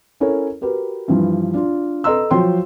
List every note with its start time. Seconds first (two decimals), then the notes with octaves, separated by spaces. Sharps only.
0.20 C#4 E4 A4 A#4 C#5
0.61 F#4 G4 A#4 B4
1.08 G2 E3 F3
1.54 D4 F4
2.04 A4 B4 D#5 A#5 C6 E6
2.31 F3 F#3 F#4 C5 G5 C6